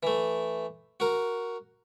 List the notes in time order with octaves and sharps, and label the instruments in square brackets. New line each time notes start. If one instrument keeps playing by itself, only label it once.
[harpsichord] E3 A3
F#4 A#4